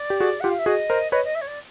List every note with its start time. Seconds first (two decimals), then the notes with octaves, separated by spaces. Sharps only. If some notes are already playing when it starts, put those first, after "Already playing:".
Already playing: D5
0.10 G4
0.20 F#4 G#4
0.40 F4 G4 F#5
0.49 F5
0.59 E5
0.66 F#4 G#4 D#5
0.90 A#4 C5
1.12 B4 C#5 D#5
1.24 D#5
1.35 E5
1.41 C#5
1.47 D5